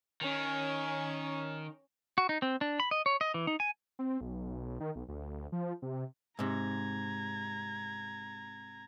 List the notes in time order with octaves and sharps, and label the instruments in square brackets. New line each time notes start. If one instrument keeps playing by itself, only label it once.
[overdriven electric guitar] D#3 [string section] C#4
[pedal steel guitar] F#4
D#4
C4
D4
B5
D#5
C#5
D#5
E3
D#4
G#5
[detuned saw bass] C4
B1
D#3
B1
D2
F3
C3
[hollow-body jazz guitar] G#2 C3 [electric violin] A#5 G#6